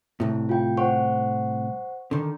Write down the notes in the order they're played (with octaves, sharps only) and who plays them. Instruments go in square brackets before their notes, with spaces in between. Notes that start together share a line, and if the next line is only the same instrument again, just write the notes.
[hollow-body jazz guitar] C2 A2 [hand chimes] E4
[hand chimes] F4 G5
C5 F#5 C#6
[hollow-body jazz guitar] D3 D#3